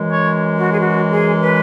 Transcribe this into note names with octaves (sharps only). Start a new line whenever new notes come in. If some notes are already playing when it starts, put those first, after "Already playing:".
Already playing: F#2 E3 G#3
C#5
F#4
G#4
F#4
G#4
B4